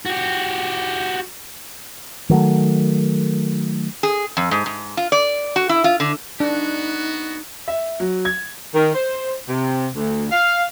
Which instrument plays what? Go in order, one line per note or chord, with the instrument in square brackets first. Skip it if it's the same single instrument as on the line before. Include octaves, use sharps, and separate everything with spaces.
[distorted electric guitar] F#4 G4
[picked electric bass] D#3 F#3 A3
[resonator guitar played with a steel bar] G#4
F2
G#2
G#2
F4
D5
F#4
E4
F4
D3
[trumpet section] B3 F#4 [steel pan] D4 [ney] D#4
[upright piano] E5
F#3
G#6
[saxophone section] D#3
C5
C3
D2
F5